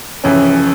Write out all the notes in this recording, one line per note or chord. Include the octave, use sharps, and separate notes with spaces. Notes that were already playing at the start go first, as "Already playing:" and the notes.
F1 F2 C#3 E3 C#4